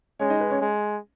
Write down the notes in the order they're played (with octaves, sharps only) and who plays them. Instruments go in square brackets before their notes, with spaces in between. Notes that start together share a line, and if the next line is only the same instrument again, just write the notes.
[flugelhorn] G#3 [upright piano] C#4 C#5
[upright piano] D#4 D#5
B4
C#4 C#5
[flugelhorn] G#3